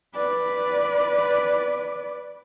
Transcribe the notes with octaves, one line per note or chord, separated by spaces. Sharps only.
B4 D5